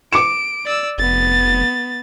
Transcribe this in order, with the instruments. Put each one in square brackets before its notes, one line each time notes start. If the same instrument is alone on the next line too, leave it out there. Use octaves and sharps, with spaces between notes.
[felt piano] D6 C#7 E7 [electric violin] D7
[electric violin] D5 E6
[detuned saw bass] F1 [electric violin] B3 A6